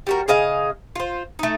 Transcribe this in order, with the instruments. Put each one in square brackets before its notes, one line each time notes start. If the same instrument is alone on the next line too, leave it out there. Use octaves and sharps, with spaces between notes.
[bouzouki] G3 F#4 A#4
C#3 G#4 D#5 F5
F4 C5
A3 D#4